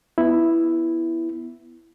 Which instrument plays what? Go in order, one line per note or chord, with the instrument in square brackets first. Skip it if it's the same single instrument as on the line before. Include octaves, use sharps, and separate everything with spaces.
[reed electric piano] B3 E4